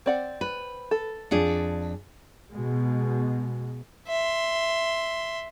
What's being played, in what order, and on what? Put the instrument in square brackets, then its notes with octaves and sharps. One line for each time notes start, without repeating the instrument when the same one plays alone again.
[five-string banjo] C4 D5 F#5
[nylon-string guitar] B4
[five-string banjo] A4
[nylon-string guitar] F2 D4 G#4
[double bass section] B2 G#3
[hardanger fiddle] E5 C6